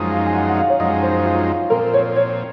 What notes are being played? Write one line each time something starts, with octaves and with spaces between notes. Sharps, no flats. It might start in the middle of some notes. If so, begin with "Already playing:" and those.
Already playing: F#2 F3 G#3 D#4
F5
G#5
F#5
F#5
F5
C#5
F#2 F3 G#3 D#4 D#5
C5
F4
A#2 F3 C4 A#4
C#5
C#5